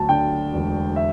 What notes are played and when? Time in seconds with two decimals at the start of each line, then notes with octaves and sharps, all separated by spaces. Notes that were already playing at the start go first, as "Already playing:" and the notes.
Already playing: D2 F#3 A5
0.09 D3 G5
0.53 E1
0.96 E5